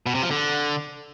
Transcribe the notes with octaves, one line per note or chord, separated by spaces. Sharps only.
B2
C3
F3
D3